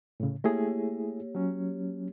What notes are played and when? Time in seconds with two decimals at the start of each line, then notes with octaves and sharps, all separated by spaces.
0.20 A2 C#3
0.44 A3 A#3 E4 G4 G#4 C#5
1.35 F#3 C#4